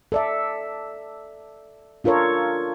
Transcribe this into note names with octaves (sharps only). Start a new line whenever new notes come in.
A4 D5 E5
D4 F4 A4 A#4 C#5